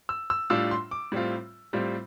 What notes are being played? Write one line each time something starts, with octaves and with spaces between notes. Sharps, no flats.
E6
E6
A2 G3 D4 F4 E6
C6
D6
A2 G3 C4 F4
A2 G3 C4 F4